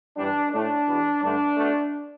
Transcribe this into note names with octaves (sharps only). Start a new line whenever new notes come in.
G2 E3 G3 D4
A2 A3 D4
E2 B2 B3
G2 D3 A3 D4
B2 A3